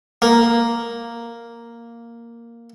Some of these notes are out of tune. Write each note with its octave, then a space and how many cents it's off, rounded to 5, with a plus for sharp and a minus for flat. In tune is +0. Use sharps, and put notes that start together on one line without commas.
A#3 +0